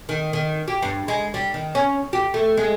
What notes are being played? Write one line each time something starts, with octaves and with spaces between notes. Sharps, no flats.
D#3
D#3
G4
G2
G#3
G3
D#3
C#4
G4
A3
G#3